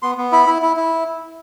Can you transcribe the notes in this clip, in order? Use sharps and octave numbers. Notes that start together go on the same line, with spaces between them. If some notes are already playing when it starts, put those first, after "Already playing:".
B3 C6
B3
E4 B5
E4
E4
E4